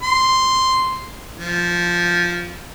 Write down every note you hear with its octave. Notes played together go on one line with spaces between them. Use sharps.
C6
F3